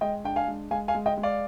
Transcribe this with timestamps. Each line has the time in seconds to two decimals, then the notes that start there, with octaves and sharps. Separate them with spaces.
0.01 G#3 D#5 G5
0.24 D4 G5
0.36 F5 G#5
0.48 G#3
0.71 G#3 F5 G#5
0.88 F5 G#5
0.95 G#3
1.06 D#5 G5
1.17 G#3
1.23 D5 F5